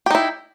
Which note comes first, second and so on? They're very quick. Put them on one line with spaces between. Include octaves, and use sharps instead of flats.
G4 D#4 E4